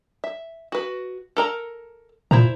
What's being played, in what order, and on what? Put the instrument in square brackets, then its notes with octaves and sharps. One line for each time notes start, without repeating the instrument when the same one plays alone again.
[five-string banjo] E5
F#4 B4
A4 A#4 A#5
[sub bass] A#2 [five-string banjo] E4 C5 A#5